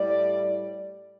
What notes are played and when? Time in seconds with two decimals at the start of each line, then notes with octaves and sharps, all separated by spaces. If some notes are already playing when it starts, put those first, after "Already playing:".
Already playing: A2 G3 D5